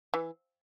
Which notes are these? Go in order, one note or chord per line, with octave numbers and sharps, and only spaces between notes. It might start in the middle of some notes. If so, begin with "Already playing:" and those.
E3